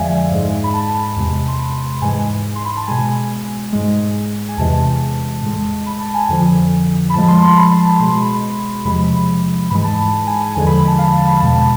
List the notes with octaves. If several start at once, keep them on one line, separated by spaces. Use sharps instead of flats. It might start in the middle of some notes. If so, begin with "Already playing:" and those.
Already playing: F2 D3 F3 G#3 D5 E5 F5 G#5
G#2 G#3
B5
A5
E2 C3 G#3
C6
B5
G#2 E3 G#3 G#5
C6
B5
A5
B2 G#3 G#5
G#2 G#3
G#5
E2 C3 E3 G#3 A5
A2 G#3
B5
A5
G#5
F2 D3 F3 G#5
B5
A2 F3 G#3 A5
C6
C6
B5
A5
B5
B2 G#3 C6
B5
E2 C3 F3 G#3 B5
G#2 E3 G#3 B5
A5
A5
G#5
G#5
E2 D3 F3 G#3 G#5
B5
B5
A5
F5
A5
B5
E2 B2 G#3 A5